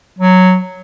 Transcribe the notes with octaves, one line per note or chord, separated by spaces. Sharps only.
F#3